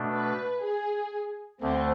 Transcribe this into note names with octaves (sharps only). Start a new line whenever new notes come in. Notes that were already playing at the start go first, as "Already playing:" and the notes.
Already playing: B2 A3 D4
B4
G#4
D2 D3 A3 C4